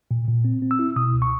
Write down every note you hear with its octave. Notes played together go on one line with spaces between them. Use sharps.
A#2
A#2
C4
C4
E6
E4
B2 D#6
C#2
C#6